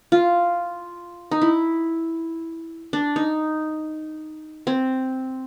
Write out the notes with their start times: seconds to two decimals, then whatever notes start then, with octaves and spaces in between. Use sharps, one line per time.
0.12 F4
1.31 D#4
1.42 E4
2.93 D4
3.16 D#4
4.67 C4